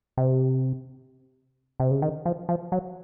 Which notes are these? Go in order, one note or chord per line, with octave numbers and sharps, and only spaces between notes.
C3
C3
C#3
D#3
F3
F3
F#3